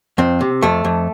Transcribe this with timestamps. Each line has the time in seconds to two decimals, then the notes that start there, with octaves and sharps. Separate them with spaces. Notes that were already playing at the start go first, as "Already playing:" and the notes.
0.18 F2 C4
0.41 C3
0.62 F2 A3
0.85 F2